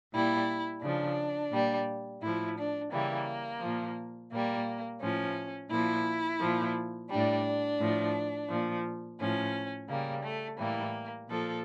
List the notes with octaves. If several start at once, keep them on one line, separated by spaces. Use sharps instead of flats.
A#2 G3 E4
C#3 F3 D4
A#2 G3
A2 F3 E4
D4
C#3 E3 G3 A#3
A#2 F3
A#2 G3 A#3
A2 F3 C#4
A#2 F3 E4
A#2 F3
A2 G3 D4
A2 F3
A#2 F3
A2 F3 C#4
C#3 G3 A#3
A3
A2 E3 G3 A#3
A#2 F3 A4